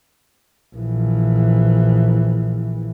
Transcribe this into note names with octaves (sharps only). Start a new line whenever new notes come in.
A#1 E3